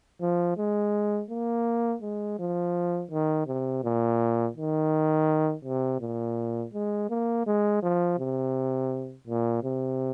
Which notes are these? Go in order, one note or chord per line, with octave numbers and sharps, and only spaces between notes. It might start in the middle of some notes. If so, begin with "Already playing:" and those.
F3
G#3
A#3
G#3
F3
D#3
C3
A#2
D#3
C3
A#2
G#3
A#3
G#3
F3
C3
A#2
C3